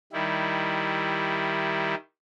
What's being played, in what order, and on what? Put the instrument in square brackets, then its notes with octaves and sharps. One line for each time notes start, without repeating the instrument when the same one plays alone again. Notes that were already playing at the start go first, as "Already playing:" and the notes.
[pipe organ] D#3 G3 E4